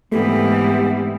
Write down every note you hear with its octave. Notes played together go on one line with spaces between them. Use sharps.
G#2 E3 G3 A3 B3 C4 G4